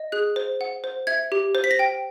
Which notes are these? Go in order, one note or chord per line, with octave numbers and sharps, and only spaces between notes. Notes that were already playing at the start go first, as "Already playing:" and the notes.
Already playing: D#5
G#4 F#6
C5
F#5
C5
E5 G#6
G4
C5
B6
A#6
G5